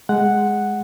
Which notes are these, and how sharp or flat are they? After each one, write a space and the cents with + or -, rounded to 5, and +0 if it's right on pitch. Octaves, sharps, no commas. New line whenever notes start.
G#3 +0 F#5 +0